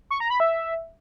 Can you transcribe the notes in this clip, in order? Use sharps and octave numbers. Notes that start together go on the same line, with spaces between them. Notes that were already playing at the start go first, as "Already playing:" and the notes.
C#6
A#5
B5
E5